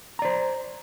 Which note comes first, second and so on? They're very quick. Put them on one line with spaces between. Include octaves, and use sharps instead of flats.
A#5 D5 C5